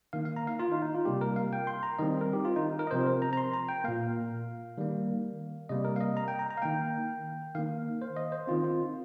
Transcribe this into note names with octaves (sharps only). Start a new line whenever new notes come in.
D#3 A#3 F5
F5
A#5
F5
F4
D#4
D#4
F4
C3 G3 A#3 G4
A#4
F5
G5
C6
A#5
D#3 G3 C4 D#5
A#4
G4
F4
D#4
A#4
D#5
C3 F3 C4 C5
A#4
A#5
A#5
C6
A#5
G5
A#2 A#3 F5
D#3 G3 A#3
C3 G3 A#3 D#5
A#4
F5
D#5
A#5
G5
A#5
A#5
F5
D#3 A#3 G5
D#3 A#3 F5
C5
D#5
C5
D#3 C4 F4
F4